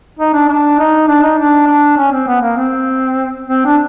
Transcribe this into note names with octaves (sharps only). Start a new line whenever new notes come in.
D#4
D4
D4
D#4
D4
D#4
D4
D4
C#4
C4
B3
A#3
C4
C4
D4